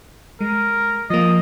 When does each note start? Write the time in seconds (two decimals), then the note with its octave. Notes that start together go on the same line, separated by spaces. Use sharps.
0.41 G#3 A#4
1.10 F3 A#3 D#5